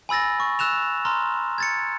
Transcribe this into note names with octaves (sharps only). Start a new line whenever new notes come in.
G#5 B5 E6 A6 A#6
C#6
E6 F#6 E7 F7
A#5 C6 F6
G#6 A6 C#7